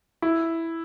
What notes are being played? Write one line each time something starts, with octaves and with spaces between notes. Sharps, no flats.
E4